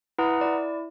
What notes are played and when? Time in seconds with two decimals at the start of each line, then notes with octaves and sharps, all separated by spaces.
0.18 E4 B4 F#5 A#5 D#6
0.41 E4 D5